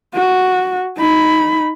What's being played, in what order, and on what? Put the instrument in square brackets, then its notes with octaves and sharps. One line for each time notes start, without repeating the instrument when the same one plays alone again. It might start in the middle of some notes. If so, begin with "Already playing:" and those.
[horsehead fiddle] F#4
D#4 B5